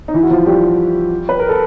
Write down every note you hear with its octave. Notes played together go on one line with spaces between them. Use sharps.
D#4
E3 E4
F#4
F3 F4
G3 G4
B4
A#4
A4